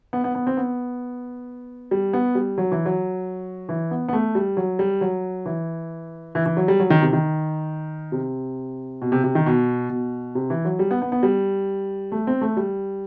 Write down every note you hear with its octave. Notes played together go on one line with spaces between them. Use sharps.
B3
B3
B3
C4
B3
G3
B3
G3
F#3
E3
F#3
E3
B3
B3
A3
G3
F#3
G3
F#3
E3
E3
E3
F#3
G3
F#3
D#3
C3
D#3
C3
B2
C3
C3
D#3
B2
B2
C3
E3
F#3
G3
B3
B3
B3
G3
A3
C4
A3
G3